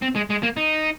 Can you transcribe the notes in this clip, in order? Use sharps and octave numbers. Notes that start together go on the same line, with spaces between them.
C4
G#3
G#3
A#3
D#4